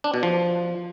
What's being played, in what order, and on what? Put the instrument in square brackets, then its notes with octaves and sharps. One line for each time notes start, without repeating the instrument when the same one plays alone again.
[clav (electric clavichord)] D4
B2
F3